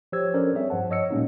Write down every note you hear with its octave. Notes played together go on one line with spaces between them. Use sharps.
F3 G4 C5 C#5 E6 G#6
C#4 D4 A4 A#4 C5 D5
G3 C4 G#4 C#5 E5
G2 F3 C5 F#5 A5
C#5 D#5 E6 C#7
A#2 G3 G#3 A#3 C#4 D#4